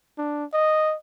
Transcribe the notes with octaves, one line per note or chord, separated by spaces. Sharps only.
D4
D#5